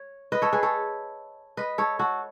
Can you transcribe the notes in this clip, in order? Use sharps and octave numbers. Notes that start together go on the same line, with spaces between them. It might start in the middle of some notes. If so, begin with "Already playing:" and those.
Already playing: C#5
B4 D#5
A4 C#5
G#4 B4
A4 C#5
B4 D#5
A4 C#5
F#4 A4